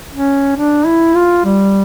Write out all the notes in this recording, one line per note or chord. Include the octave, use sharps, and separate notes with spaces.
C#4
D4
E4
F4
G3